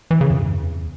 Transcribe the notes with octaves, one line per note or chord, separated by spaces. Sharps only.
E3
C#3
F2
G2
E2